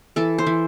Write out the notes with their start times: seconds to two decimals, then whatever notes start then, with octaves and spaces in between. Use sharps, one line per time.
0.16 E3 A4
0.38 C5
0.47 E3